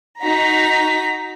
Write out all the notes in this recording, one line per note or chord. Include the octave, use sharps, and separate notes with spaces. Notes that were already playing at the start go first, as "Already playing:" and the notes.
D#4 F#4 A#5 B6